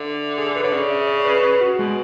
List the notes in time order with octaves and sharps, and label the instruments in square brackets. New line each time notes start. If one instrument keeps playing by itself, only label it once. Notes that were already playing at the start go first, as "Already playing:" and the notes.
Already playing: [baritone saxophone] D3 [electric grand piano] E5
[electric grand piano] G#4
A4
B4
[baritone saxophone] D3 [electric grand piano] C#5
[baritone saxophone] C#3 [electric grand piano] D5
[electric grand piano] E5
D5
B4
B4
F#4
[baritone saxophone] B2 [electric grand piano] G#3